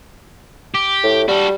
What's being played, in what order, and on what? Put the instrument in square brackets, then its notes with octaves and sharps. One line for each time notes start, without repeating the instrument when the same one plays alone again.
[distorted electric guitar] G4
[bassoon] A2
[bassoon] G3 [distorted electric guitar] F#4 A4